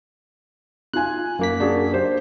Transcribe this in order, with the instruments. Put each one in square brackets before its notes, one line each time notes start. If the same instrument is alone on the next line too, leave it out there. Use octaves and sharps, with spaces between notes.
[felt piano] D#4 F4 G#5 [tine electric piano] F#6
[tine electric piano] F#2 A#3 B6
[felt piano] D4 F#4 G#4
G4 C5